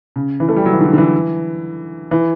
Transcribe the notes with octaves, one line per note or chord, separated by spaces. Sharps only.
C#3
E3
A3
G3
F#3
E3
D3
D3
E3
E3